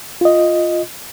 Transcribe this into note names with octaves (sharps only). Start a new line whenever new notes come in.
F4 D#5